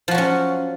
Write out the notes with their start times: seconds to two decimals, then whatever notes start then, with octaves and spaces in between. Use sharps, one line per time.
0.08 F3
0.11 F#4
0.15 F#3
0.18 C#4